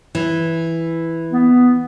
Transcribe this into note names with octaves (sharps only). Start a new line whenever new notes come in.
E3
B3